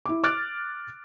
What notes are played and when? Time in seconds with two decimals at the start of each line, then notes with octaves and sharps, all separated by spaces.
0.06 E4 D6
0.24 D6 F6 F#6 A6 D7